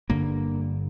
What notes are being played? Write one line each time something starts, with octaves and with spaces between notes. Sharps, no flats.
G1 G2 D3 A#3